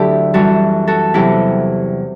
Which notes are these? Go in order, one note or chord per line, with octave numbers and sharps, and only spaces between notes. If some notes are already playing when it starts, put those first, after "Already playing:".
Already playing: D2 D3 F#3 E4 G4 A4
F#2 E3 G3 F#4 A4
F#4 A4
E2 C3 F#3 E4 G4